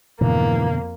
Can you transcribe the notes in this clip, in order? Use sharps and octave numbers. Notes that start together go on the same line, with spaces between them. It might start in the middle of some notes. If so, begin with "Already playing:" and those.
F2 G#2 B2 D3 E3 A#3